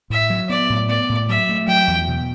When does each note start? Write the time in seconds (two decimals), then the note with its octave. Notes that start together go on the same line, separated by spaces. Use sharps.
0.10 A2 E5
0.30 F#3
0.50 B3 D5
0.70 A2
0.89 B3 D5
1.09 A2
1.29 F#3 E5
1.49 A3
1.68 F#3 G5
1.88 E2
2.08 B2